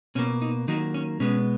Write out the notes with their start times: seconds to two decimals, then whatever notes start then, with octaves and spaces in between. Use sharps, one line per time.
0.15 B2 C#4
0.19 A#3
0.42 D#4
0.68 D#3 F#3 A#3 D#4
0.94 C#4
1.20 B2 G#3 B3 C#4